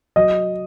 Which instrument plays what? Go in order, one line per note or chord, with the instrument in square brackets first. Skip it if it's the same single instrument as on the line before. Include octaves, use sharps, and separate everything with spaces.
[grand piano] F#3 D#5